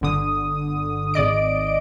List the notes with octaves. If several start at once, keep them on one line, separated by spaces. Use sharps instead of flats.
G1 D3 D#6
G#1 D5 D#5 D7